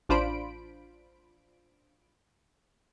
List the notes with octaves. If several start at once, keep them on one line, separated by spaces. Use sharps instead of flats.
A1 D4 F4 C5 B5 D7